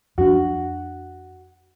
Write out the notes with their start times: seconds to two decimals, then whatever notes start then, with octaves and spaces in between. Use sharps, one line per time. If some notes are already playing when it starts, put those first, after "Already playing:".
0.18 F2 D4 F#4